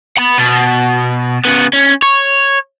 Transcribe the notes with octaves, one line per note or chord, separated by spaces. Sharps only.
F#5 B5
B2
C#3 B3
C#4
C#5